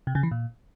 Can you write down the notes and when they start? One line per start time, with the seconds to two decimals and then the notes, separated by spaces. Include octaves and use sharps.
0.07 C3
0.15 C#3
0.23 E3
0.31 A#2